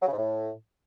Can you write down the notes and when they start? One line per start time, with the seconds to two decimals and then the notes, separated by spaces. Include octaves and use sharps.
0.03 F#3
0.08 C#3
0.13 G#2
0.18 A2